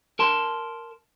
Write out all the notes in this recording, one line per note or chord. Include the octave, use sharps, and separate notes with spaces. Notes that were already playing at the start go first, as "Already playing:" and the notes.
A#4 A5 C6